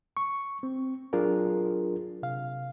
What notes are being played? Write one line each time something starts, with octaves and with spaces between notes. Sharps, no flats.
C#6
C4
F#3 D4 F4 G#4 A#4
C3 F5